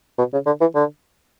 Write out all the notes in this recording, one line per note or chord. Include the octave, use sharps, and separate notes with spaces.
B2
C#3
D3
E3
D3